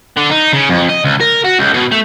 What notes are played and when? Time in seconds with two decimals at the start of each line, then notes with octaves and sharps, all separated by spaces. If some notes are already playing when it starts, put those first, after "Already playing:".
0.17 D3
0.31 D#4
0.53 C#3
0.69 F2
0.89 D#5
1.04 C#2
1.20 A#4
1.44 F#4
1.59 C#2
1.74 B2
1.92 A3